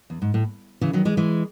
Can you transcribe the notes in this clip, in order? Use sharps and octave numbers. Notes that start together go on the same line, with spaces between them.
E2
G#2
A2
C#3 E3
D#3 F#3
E3 G#3
E3 G#3